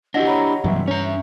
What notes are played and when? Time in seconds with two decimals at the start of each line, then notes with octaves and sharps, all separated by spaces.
0.14 D4 E4 F#4 G4 D#5 F#5 A#6
0.26 C#5 A#5 B5
0.64 G2 C3 E3 F#3 G3 E5
0.88 C#4 C#5 A#5